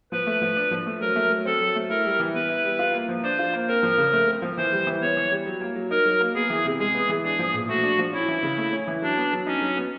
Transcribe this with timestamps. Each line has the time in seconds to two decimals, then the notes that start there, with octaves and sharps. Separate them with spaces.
0.12 F3 B4
0.27 A3
0.42 F3
0.57 D4
0.71 F3
0.86 A3
1.01 F#3 A#4
1.16 A3
1.31 F#3
1.45 C4 A4
1.61 F#3
1.75 A3
1.90 E4 A#4
2.05 G3
2.20 E3
2.34 B3 B4
2.50 E4
2.64 G3
2.79 F4
2.94 A#3
3.09 F3
3.24 D4 C5
3.39 F4
3.53 A#3
3.68 C4 A#4
3.83 F3
3.98 C#3
4.13 A3
4.27 C4
4.42 F3
4.57 E3 C5
4.72 G3
4.87 E3
5.02 B3 C#5
5.17 E3
5.31 G3
5.46 F#3
5.61 A#3
5.76 F#3
5.90 D#4 A#4
6.05 F#3
6.21 A#3
6.35 B3 G#4
6.50 E3
6.65 C3
6.79 G#3 G#4
6.95 B3
7.09 E3
7.24 D4 G#4
7.39 F3
7.54 A#2
7.69 A3 F#4
7.84 D4
7.99 F3
8.13 C#4 E4
8.28 E3
8.43 C#3
8.58 A3
8.73 C#4
8.88 E3
9.02 F#3 D4
9.17 B3
9.32 F#3
9.47 C#4 D#4
9.62 F#3
9.76 B3